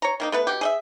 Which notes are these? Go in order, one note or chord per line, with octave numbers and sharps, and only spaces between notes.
C#5 A#5
D#3 A#3 D#4
A3 B3 B4
B2 G4
G#4 D#5 E5